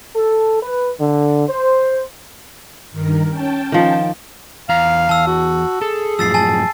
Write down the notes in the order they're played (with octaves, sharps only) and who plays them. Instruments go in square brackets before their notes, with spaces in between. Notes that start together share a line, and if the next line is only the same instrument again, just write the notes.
[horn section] A4
B4
D3
C5
[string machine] G2 D#3 A#4
C#4 G5 A5
[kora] D#3 F3
[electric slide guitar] E2 A#5 [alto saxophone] F5
[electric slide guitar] E2 [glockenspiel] A5 E6
[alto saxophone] F#4
[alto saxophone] G#4 [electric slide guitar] A4
[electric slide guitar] F#2 A2 F3 [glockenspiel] E6 A6 C7
[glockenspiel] G#5 A5 A6